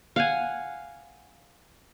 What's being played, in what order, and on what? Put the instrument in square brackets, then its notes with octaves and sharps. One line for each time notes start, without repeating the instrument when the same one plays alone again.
[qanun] F5 F#5 G#5